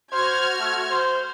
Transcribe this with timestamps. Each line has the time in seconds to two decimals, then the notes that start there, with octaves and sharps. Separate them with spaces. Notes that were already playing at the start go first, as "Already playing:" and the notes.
0.12 F#4 C5 F6 G#6
0.59 A3
0.91 C5